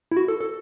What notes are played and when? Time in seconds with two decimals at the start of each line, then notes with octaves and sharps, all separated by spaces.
0.12 E4
0.17 F#4
0.28 A4
0.41 A4